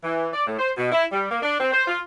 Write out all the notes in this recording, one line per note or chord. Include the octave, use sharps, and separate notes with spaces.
E3
D5
A2
C5
B2
E4
G3
A#3
D4
C4
C5
F4